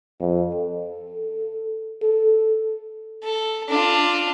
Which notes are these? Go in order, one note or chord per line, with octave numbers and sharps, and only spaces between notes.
F2
A4
A4
A4
D4 F4